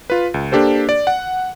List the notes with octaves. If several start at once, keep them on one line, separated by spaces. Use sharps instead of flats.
F4 B4
C#2
A#3 D4 G4 A4 C5
D5
F#5